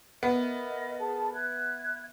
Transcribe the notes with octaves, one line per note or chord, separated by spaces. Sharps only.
B3 A#4 D#5 E5
G#4 A#4 A5
E5 F#6 G#6